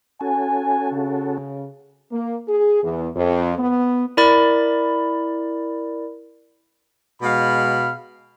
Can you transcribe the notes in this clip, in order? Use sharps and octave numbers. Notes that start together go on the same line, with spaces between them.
C#4 F#4 A4 G#5
C#3
A#3
G#4
E2
F2
B3
E4 A#4 D5 B5 A6
B2 G#3 F5 B5